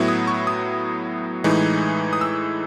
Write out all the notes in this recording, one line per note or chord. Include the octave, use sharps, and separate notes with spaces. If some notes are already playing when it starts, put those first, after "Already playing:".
Already playing: A2 F#3 B3 E4
D#6
C#6
D#6
A2 E3 G#3 D#4
D#6
E6